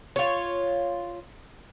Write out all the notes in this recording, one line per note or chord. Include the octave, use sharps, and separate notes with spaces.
F4 C#5